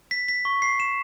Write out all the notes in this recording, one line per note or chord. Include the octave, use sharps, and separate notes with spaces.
B6
B6
C#6
C7
E7